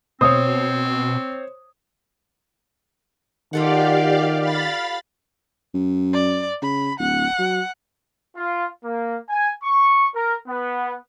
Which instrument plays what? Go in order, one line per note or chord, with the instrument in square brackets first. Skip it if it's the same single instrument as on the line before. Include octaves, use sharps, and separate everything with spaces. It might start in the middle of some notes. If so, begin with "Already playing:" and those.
[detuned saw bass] B2 [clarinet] C4 [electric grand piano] C5 C#5 [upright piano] D#6
[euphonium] D#3 [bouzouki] F4 A4 F#5 [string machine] G4 D5 F5
[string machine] F5 B5 A6
[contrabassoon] F#2
[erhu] D5
[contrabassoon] C#3 [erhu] B5
[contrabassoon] D1 [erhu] F#5
[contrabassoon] F#3
[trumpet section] F4
A#3
G#5
C#6
A#4
B3